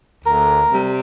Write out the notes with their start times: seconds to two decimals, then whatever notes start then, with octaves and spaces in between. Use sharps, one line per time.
0.25 D2 A#4
0.71 C3 G3